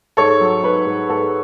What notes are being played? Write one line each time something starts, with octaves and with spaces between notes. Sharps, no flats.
G#2 A4 C#5
F#3
G#2 B4
G#2
G#2 A4